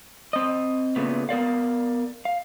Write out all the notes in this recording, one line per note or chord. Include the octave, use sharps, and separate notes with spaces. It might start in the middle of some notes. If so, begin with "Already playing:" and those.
C4 D#5
A#2 C#3 A3 B3
B3 A#4 D5 F5
F5